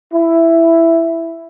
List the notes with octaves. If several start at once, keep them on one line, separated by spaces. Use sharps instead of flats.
E4